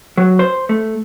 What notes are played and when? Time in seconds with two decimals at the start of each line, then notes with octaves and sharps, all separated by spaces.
0.17 F#3
0.39 C5
0.69 A3